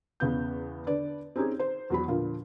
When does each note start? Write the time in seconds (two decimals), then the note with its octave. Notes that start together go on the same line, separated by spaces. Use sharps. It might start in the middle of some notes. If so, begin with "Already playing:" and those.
0.20 E2 C#3 B3 G6
0.87 D3 B4 D5
1.36 C4 C#4 D#4 G4 G#4
1.59 C5
1.90 E2 F#3 B5
2.08 A#2 D3 F3 F4